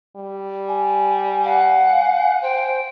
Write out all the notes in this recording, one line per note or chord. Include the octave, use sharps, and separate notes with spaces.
G3
G#5
F5 F#5
C5 G5